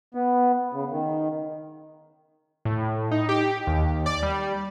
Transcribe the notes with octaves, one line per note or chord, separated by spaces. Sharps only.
B3
C#3
D#3
A2
D#4
G4
D#2
D5
G3